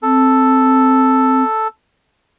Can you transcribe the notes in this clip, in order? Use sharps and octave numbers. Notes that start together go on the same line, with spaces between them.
C4 A4